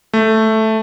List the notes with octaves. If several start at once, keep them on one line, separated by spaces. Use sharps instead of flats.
A3